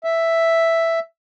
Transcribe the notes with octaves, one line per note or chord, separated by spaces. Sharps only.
E5